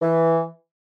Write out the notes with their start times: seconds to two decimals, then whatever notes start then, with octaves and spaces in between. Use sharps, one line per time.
0.02 E3